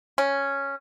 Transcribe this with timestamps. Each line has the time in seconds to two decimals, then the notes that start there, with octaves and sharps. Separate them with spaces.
0.18 C#4